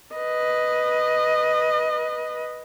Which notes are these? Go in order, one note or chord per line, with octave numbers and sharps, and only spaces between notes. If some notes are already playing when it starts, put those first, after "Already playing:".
B4 D#5